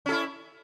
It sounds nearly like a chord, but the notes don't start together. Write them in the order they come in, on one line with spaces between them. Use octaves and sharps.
C#4 A4 E4